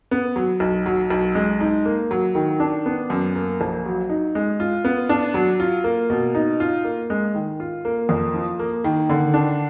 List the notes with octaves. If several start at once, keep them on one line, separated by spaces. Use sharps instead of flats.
B3
F#3
B1
F#3
B1
G#3
D#4
A#3
F#3
D#3
D4
B3
F#2
A#3
A#1
F#3
D#4
G#3
F4
B3
D4
F#3
F4
A#3
B2
D#4
F4
A#3
G#3
D#3
F4
A#3
F2
F3
A#3
D#3
D3
D4